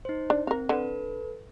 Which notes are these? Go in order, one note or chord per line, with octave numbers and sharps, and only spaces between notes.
D#4 C5
D4
C4 A#4 F5
D3 A4 B4